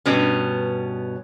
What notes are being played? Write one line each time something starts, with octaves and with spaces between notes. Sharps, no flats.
G2 B2 B3 C#4